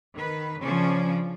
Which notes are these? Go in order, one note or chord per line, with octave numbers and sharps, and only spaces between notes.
D#3 B4
C#3 F3 C#4 D4 D5